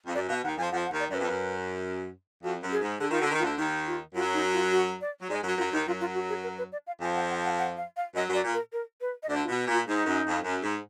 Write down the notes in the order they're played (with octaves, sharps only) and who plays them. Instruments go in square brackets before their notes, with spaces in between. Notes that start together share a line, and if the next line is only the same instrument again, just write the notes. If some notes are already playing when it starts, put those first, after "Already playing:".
[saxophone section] F2
[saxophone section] F#2 [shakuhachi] D5
[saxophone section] B2 [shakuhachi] F5
[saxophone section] D#2 D#3 [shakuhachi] F#5
[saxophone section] F2 F3 [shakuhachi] G#5
[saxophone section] F2 F3 [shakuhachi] F#5
[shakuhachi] F#5
[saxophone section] D#2 D#3
[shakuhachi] D5
[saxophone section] F#2 [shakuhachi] B4 D5
[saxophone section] F2
F#2
[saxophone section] F2 [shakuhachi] F#4
[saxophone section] F#2
[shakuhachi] G#4
[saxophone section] G#2
[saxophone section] D3 [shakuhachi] G#4
[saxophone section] D#3 [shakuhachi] F4
[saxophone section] D3 [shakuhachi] F#4
[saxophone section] D#3
[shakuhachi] F4
[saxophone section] D2 D3
[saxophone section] D#2 D#3 [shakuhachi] D#4
[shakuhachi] F4
[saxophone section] F#2 F#3 [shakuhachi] F4
[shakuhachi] D#4
F4
F#4
D5
[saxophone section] F#3
[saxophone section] G#2 G#3 [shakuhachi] D5
[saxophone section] F#2 F#3 [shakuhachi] F#4
[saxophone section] F#2 F#3 [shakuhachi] F4
[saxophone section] D#2 D#3 [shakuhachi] D#4
[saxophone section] F#2 F#3 [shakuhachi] F4
[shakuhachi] F4
F#4
G#4
A#4
B4
D5
F5
[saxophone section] F2 F3 [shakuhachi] G#5
[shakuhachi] F#5
F#5
F#5
F#5
F5
F5
[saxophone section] F#2 F#3 [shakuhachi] D#5
[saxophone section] F#2 F#3 [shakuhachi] D5
[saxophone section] A#2
[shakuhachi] A#4
A#4
B4
D#5
[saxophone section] D2 D3 [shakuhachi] D5
[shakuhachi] F4
[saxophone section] B2
[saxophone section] A#2 [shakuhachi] F4
[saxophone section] G#2 [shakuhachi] D#4
[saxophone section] F#2
F2
F#2
G#2